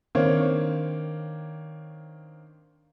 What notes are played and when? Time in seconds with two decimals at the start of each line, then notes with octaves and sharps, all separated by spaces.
0.15 D#3 A#3 C4 D4 C#5